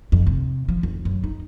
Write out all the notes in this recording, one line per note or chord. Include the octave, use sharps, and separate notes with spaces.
F2
C3
F3
F1
F#2
D#4